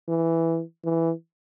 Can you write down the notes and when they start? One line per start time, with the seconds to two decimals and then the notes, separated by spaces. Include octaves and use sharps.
0.09 E3
0.85 E3